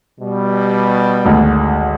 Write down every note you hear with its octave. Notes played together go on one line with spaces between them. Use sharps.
B2 G3
G#1 D2